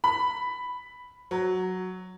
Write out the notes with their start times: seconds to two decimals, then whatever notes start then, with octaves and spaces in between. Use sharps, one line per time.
0.04 B5
1.31 F#3